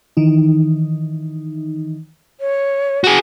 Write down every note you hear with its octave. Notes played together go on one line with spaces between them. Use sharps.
D#3 E3 D#4
C#5
F#4 G#4